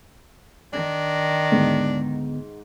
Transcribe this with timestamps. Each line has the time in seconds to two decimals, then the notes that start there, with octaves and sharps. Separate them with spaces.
0.73 D#3 D4
1.52 D2 G#2 D3 B3